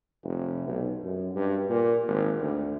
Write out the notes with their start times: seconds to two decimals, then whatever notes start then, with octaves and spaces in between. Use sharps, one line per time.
0.24 F1
0.68 B1
1.03 F#2
1.35 G2
1.69 A#2
2.07 G#1
2.42 D2